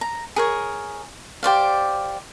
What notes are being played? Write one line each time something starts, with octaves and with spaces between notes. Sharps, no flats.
A#5
G#4 A#4 C#5
G4 C5 D5 F5